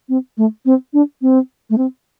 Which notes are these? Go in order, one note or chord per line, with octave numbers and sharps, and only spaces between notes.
C4
A3
C4
D4
C4
A3
C4